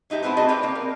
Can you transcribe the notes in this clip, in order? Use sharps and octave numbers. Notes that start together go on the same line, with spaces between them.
F#3 D#4 E4 G4
A3 B3 C4 E4 B4
F#4 G#4 B4 D5 D#5 G#5
C4 G4 B4 D5
A#3 C4
A#4